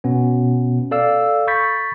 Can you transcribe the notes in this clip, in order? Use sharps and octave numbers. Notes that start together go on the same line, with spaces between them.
B2 B3 C#4
A4 D5 F5 E6
B5 C#6 G6 A6 B6